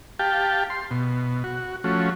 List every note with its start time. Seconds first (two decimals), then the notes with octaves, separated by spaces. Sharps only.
0.19 G4 F5 G5 A5
0.70 C6
0.91 B2
1.44 F#4
1.84 F3 A3 C#4 F#4